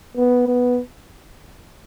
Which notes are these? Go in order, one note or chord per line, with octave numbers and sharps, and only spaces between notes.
B3
B3